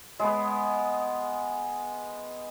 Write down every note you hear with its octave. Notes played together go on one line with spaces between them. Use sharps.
G#3 B3